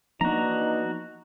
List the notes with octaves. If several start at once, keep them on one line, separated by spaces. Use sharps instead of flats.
E3 F3 A#3 B3 D4 D#4 F#4 A#5